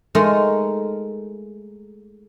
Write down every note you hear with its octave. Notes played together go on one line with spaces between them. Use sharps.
G#3 A3 D#4 A#4